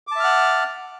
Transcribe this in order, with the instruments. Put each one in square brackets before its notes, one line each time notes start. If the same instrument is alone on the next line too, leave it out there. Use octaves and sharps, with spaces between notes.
[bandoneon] D6
A5
E5
F6
F#5